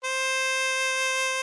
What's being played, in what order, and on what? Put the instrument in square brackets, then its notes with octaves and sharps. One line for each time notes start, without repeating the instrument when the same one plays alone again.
[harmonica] C5